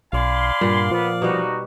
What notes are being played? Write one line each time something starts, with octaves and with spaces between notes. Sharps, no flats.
B1 D5 F5 G#5 B5 C6
G2 A#2 F#5
F3 B3
B2 G3 D#4 F#4